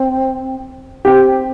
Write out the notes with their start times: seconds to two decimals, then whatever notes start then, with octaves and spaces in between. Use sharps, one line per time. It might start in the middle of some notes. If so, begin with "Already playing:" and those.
Already playing: C4
1.04 C4 G4